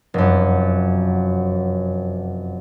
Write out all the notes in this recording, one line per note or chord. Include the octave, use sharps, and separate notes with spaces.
F1 F#2